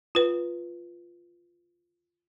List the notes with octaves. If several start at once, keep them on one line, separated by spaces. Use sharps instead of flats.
F4 B4